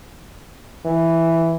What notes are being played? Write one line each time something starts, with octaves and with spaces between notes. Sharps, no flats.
E3